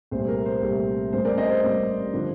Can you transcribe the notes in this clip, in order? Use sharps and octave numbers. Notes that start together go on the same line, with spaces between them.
C2 A#2 A3 C5
A#4
C5
C2 A#2 A3
A1 A2 G3 A#3 C5
A#4 D5
C5 D#5
C5
A1 A2 G3 A#3
D3 F3